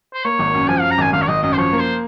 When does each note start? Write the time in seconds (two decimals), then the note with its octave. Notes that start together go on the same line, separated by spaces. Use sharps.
0.14 C5
0.24 A#3 C#5
0.39 G#1
0.54 F#2
0.68 F3 G#5
0.80 F#2 F5
0.91 A#5
0.98 G#1 G#5
1.13 G#1 F5
1.22 C#5
1.28 G#1 D#5
1.43 F#2 D#5
1.53 C5
1.58 F3 C#5
1.72 A#3
1.79 C5